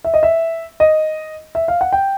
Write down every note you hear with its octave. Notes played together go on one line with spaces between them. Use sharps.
E5
D#5
E5
D#5
E5
F5
F#5
G5